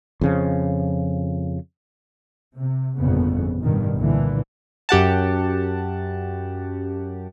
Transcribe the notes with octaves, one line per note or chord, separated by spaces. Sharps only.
F2 C#3 F3
C3
G1 F2 A#2 C#3 B3
A1 G2 B2 D#3
C2 A#2 D3 E3
F#2 G4 F#5 A5